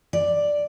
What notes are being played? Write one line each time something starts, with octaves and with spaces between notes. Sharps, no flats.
D5